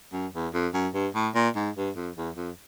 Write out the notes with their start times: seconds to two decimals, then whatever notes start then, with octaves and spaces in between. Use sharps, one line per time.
0.13 F#2
0.34 E2
0.54 F2
0.74 F#2
0.94 G2
1.15 A2
1.35 A#2
1.56 G#2
1.76 G2
1.96 F2
2.16 E2
2.36 F2